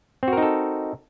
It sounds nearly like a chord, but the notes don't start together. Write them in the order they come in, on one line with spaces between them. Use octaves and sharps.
C4 F#4 A#4 D#4 A4